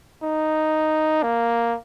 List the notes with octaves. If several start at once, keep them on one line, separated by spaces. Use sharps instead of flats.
D#4
A#3